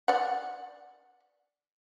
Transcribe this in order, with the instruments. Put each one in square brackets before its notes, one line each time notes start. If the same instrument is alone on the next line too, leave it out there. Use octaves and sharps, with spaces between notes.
[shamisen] D5 F#5